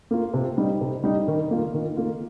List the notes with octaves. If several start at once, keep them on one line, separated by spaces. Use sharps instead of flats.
A#3 F4
C3
G3 D#4
C3
G3 D#4
D#3
A#3 F4
D#3
A#3 F4